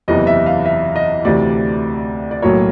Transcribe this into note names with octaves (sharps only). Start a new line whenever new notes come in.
F#1 E2 C3 E3 D#5
E5
F5
E5
D#5
D2 C3 E3 D5
D5
B1 A2 F#3 A#3 C#5